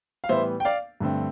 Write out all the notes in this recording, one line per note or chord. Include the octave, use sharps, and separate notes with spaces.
F5
A2 E3 G3 B3 C5 E5
G5
D5 F5
G2 D3 A3 C4